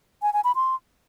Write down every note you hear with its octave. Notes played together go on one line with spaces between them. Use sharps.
G#5
G#5
B5
C6